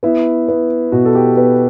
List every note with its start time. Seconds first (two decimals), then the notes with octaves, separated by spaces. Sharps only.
0.03 B3 E4
0.48 B3
0.92 B2 F#4
1.05 A4
1.15 G4
1.37 B3 B4